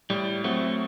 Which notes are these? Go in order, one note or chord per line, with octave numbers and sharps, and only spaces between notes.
A2 G3
F#3 A3 C4 F#4